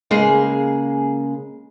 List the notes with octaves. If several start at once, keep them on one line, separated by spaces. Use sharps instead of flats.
C#3 G#3 A#3 G#4